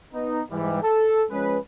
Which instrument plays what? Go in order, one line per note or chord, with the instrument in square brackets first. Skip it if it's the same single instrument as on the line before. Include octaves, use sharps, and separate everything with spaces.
[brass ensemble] B3 D#4
G#2 E3 G3
A4
F3 G#3 C#4 G#4 B4